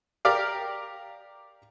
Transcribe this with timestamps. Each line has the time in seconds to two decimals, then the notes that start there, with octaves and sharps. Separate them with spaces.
0.25 G4 A#4 D5 F5